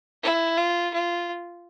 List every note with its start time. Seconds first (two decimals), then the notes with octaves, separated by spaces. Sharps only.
0.23 E4
0.57 F4
0.93 F4